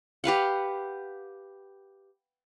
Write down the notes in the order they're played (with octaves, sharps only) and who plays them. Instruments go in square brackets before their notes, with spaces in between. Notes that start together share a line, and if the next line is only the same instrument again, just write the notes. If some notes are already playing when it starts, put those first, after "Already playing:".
[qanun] G4 B4 F5 F#5